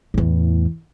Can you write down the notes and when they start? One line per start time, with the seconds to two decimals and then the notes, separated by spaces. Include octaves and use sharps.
0.14 E2 A2